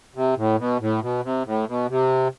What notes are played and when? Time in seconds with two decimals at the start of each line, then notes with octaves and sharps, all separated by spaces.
0.15 C3
0.37 A2
0.58 B2
0.80 A2
1.02 B2
1.23 C3
1.45 A2
1.67 B2
1.89 C3